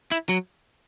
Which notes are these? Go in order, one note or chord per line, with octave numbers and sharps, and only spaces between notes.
E4
F#3